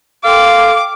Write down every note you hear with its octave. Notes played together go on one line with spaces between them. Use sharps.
A4 F5 G5 C6 D6